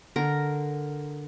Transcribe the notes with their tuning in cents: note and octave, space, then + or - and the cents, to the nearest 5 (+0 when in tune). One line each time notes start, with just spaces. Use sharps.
D3 +0 A#4 +0 A#5 +0